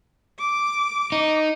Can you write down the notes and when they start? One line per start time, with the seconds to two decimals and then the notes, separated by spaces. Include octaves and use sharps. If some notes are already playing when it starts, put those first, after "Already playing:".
0.39 D6
1.12 D#4